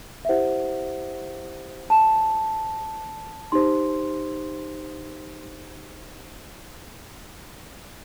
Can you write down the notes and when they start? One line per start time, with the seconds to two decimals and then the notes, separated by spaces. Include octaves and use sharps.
0.25 E5
0.29 E4 G4 C5 F#5
1.90 A5
3.52 D#4 G4 C5 C6